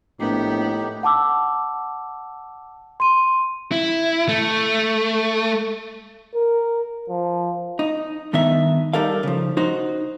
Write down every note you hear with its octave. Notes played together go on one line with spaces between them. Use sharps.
A#1 A2 B3 D#4 G4
F#5 A5 D6 E6
C6 D#7
E4
A3
A#4
F3
D#4
G2 D#3 B3 D#4 E5
G3 D#4 A4 A#4 F5
C#3 F3
D#4 F#4 C5